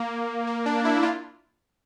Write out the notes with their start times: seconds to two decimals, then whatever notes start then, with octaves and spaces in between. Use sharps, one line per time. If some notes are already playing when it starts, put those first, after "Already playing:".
Already playing: A#3
0.47 A#3
0.66 D4
0.85 E4
1.03 F4